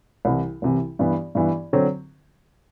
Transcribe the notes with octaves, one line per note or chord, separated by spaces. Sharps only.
C2 C3 E3
C2 C3 E3
G2 E3 B3
G2 E3 B3
D3 F#3 C4